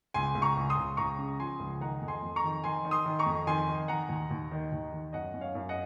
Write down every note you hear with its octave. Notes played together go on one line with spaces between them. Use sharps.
C#2 G#5 C6
C#2
A#5 C#6
C#2
C6 D#6
C#2
C#2 A#5 C#6
C#3
F3 G#5 C6
C#2
D#3 F#5 A#5
F2
G#5 C6
F2
A#5 C#6
D#3
D#3 G#5 C6
D#3
C6 D#6
D#3
A#5 C#6
F2
D#3 G#5 C6
D#3
D#3 F#5 A#5
D#2
D#2
D#3
D#2
D#3
F#2 D#5 F#5
F#2
C#5 F5
F#2
D#5 F#5